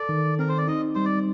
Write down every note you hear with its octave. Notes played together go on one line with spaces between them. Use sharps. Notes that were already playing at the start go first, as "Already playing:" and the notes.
Already playing: A4 D5
D#3
C4 A#4
C5
D5
D#4 D#5
G3 C5
D5